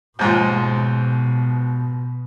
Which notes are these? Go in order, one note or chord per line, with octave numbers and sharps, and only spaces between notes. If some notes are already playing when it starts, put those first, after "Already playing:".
D#2 G#2 B2 F3